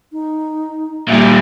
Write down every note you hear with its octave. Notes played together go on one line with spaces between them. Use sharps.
D#4
A#2 G3 E5